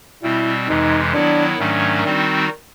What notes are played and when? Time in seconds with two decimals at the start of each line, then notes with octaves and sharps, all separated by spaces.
0.22 B2 G3 C4 E4
0.67 F2 C3 E3 G#3 D#4
1.13 D#3 F#3 B3 D4 E4
1.58 G#2 D#3 F#3 A3 C#4 D4
2.04 D#3 G3 C4 D#4 F#4